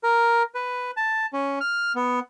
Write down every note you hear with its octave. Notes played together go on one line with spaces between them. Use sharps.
A#4
B4
A5
C#4
F6
B3